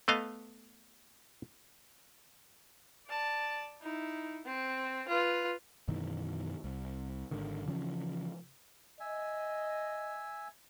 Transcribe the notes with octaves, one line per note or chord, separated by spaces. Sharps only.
A3 B3 D#5 F5
D5 A5
D#4 E4
C4
F4 B4
F#2 B2 D#3 E3
C2
G#1 G#2 D3 D#3
C#3 E3 F3 C#4
D#5 E5 G#5